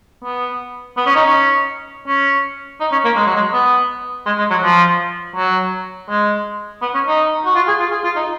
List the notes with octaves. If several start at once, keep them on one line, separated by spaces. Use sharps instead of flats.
B3
B3
C#4
D#4
C#4
C#4
D#4
C#4
A#3
G#3
F#3
G#3
B3
G#3
G#3
F#3
F3
F#3
G#3
B3
C#4
D#4
F#4
F4
G#4
F4
G#4
F4
D#4